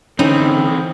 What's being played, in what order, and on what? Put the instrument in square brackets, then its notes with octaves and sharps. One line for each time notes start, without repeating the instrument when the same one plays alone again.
[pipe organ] D3 [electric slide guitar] E3 C4 [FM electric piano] C#4 [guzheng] D#4